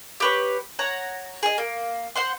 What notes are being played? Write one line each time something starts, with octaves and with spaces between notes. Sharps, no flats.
G4 B4 C#5
C#5 F#5 A#5
G#4 D#5
A#3
C5 F#5 C6